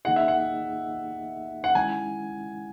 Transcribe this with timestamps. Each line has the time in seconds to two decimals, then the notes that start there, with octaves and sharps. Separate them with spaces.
0.05 D#3 A#3 D#4 G#4 D#5 F#5
0.16 E5
0.28 F#5
1.64 F#5
1.75 D#3 G#3 C#4 E4 G#5